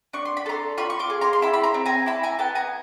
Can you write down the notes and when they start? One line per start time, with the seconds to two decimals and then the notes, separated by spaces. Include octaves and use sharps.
0.13 D4 C#6
0.25 C6
0.37 B5
0.46 A4 A#5 C6
0.78 F4 B5 C#6
0.90 C#6
0.99 C6 D6
1.10 G#4
1.21 A#5 C6
1.33 C6
1.42 E4 A5 B5
1.54 B5
1.63 A#5 C6
1.74 C4
1.85 G#5 A#5
2.06 E4 A5 B5
2.23 G#5 A#5
2.39 B3 G5 A5
2.55 G#5 A#5